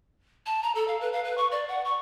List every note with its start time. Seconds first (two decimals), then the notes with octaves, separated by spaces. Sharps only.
0.46 A5
0.63 A#5
0.75 A4
0.88 F5
1.01 B4
1.13 F5
1.24 B4
1.38 C#6
1.51 D5
1.68 F#5
1.85 C#6